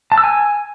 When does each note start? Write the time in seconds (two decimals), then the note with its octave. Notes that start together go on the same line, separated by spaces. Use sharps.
0.12 A5
0.18 E6
0.24 G#5